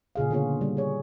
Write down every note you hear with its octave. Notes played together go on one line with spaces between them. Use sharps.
A#2 C#3 G#4 F5
D3 A#3 B3 F4 G#4 C#5
G3
G#4 C#5